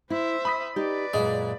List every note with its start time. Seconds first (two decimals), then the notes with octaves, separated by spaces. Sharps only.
0.10 E4 C5 E5
0.45 G#5 B5 D#6 B6
0.76 D#4 G4 B4 D5
1.14 F#2 A#2 G#3 A#3